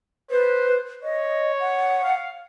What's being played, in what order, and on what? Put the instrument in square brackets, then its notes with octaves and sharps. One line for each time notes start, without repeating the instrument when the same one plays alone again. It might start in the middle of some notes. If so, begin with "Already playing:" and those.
[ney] B4 [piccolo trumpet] C5
[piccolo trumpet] C#5 [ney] D#5
[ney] F#5
[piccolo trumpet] F5